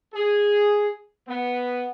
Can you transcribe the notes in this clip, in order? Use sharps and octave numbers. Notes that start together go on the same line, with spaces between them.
G#4
B3